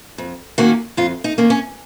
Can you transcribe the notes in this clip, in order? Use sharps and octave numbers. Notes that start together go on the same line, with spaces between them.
F2
D#3 A#3 C#4 F#4
F2 F4
D#4
D#3 A#3 C#4
C#4